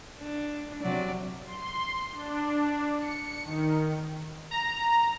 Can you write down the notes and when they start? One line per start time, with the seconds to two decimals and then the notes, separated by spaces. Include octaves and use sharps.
0.20 D4
0.82 C3 F#3 D5
1.45 C6
2.14 D4
2.97 C#7
3.43 D#3
4.51 A#5